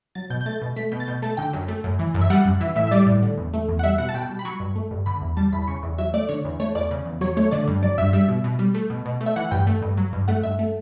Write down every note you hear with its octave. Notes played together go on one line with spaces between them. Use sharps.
F#3 A6
B2 G6
G6
A3 A6
B2
A3 B6
B2 G6
A6
B2 G6
A3 A5
D3 G5
F#2
A3
F#2
E3
F#2
E5
G3 F#5
F#2
E3 E5
A2 E5
E5
G3 D5
A2
D3
E2
A3
E2
F#5
G3 E5
B2 F#5
A5
B2 G5
G3
B5
F#3 C#6
G2
A3
G2
D3 B5
E2
G3 A5
E2 B5
B5
C#3 C#6
E2
F#3 E5
A3 D5
D3 C#5
E2
A3 C#5
E2 D5
C#3
E2
F#3 C#5
A3 C#5
D3 D5
G2
F#3 D5
G2 E5
G3 E5
B2
B2
G3
A3
B2
B2
A3
E5
E3 F#5
G2 G5
A3
G2
F#3
G2
A3 F#5
G2 E5
A3